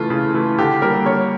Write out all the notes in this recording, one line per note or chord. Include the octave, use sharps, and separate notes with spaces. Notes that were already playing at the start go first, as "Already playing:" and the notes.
Already playing: C#3 E3 A3 F4
C#3
E3 A3
D3 G4
G3 A#3 A#4
D3 C#5